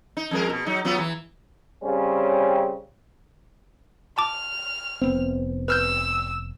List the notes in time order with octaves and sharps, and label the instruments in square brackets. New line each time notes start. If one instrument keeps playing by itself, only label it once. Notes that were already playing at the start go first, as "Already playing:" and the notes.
[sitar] D#4
F2 G#3 A#4
B2
F#3 D#4
F#3 B3 F4
E3
[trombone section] C#3 G3 C4 C#4
[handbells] A5 D6 [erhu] F6
[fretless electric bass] F1 B3 C4
[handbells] B4 F6 G6 [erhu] E6